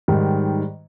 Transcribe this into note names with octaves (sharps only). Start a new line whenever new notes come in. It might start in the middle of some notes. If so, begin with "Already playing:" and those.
G#2 D#3 G3